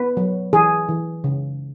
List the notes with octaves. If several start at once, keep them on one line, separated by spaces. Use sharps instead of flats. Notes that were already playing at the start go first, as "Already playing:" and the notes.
Already playing: B3 B4
F#3
E3 G#4
E3
C#3